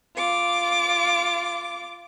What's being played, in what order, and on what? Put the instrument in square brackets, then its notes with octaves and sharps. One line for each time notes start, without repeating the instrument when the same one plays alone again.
[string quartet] F4 D6